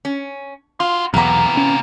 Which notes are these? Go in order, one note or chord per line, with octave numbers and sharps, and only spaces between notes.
C#4
F4 F#4 C6
B1 E2 C3 E3 A#3 B3 A#5
C#4